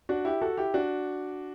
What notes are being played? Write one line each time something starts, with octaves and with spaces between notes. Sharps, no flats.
D4 F#4
E4 G4
F#4 A4
E4 G4
D4 F#4